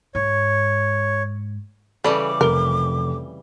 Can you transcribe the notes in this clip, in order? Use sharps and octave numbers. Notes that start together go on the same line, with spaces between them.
G#2 C#5
C#3 E3 G3 A4 D5 D6
F1 A#4 G7